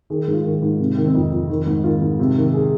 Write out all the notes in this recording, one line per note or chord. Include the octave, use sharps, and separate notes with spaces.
D#3 G#4
A#4
G#2
F4
D#3
G#2
C3
D#3
C4
F2 D#4
F2
D#3
G#2
D#3 F4
G#2
C3
D#3
G#4